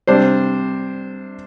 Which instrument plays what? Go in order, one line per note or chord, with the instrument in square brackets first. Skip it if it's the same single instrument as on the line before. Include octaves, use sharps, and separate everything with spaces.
[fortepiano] C3 G3 D4 C5